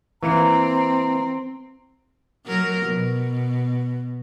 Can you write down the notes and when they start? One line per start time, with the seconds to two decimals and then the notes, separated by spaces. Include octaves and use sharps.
0.23 E3 A#3 C4 A#5
2.47 F#3 A#4
2.86 B2